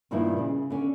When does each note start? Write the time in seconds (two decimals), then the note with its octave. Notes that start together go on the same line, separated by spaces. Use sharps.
0.11 G2 A#2 D#3 F3 D4 E4
0.38 C#3
0.70 D3 C#4